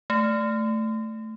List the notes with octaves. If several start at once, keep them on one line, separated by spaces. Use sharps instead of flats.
A3